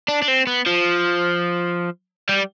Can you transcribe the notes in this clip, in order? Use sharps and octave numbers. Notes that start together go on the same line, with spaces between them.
D4
D4
C4
B3
F3
G3